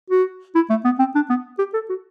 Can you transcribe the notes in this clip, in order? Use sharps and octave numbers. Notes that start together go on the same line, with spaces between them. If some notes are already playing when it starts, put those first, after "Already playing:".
F#4
E4
A3
B3
C4
D4
B3
G4
A4
F#4